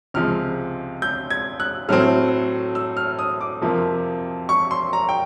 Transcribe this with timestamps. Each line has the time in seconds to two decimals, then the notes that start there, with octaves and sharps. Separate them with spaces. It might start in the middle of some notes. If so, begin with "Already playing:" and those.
0.14 C#2 C3 F3 G#3 F6
1.02 G6
1.30 G#6
1.60 F#6
1.89 A2 F#3 A3 C4 F6
2.75 E6
2.97 F6
3.19 D#6
3.41 D6
3.62 F2 C3 F3 A#3
4.49 C#6
4.71 C6
4.93 A#5
5.09 G5